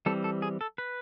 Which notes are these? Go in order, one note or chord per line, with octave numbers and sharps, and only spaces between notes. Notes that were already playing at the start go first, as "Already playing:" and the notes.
E3 G3 C4 A4
A4
G#4
A4
B4